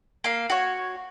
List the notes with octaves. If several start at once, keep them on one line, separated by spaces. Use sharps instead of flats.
A#3 F5
F#4 C#5